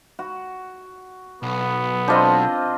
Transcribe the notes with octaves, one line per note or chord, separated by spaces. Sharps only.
F#4
B1 B3
C4 D4 F4 C5 D#5